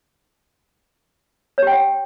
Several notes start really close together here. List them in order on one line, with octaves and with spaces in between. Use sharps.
C#5 G4 G5 F#5